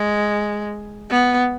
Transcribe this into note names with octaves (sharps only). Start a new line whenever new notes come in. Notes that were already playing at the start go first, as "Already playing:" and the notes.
Already playing: G#3
B3